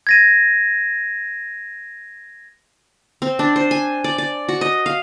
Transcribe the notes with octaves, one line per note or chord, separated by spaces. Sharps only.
G#6 A#6 D#7
C4
D4
C5
G#5
D5
D5
F#4
D#5
F5